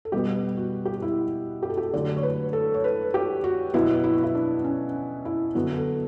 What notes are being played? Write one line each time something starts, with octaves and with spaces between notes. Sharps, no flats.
A4
B2 G3 B3 G4
F#4
G4
F#4
E4
G4
A4
G4
D3 F#3 A3 D5
C#5
B4
A4
C#5
B4
G4
F#4
B2 F#3 B3 E4
E4
F#4
E4
D4
C#4
E4
D3 F#3 B3 F#4
A4